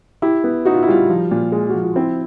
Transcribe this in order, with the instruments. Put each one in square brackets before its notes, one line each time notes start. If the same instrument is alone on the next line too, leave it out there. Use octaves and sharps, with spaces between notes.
[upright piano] E4 [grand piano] G4
[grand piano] B3
[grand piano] D#4 [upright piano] F#4
[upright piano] F4
E4
[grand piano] G3 [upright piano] F4
[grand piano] F3
A#2
G#3
[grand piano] F3 [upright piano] F#4
[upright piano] F4
[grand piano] C4 [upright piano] E4